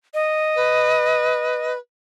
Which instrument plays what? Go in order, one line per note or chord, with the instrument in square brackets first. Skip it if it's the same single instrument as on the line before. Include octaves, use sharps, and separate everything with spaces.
[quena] D#5
[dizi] B4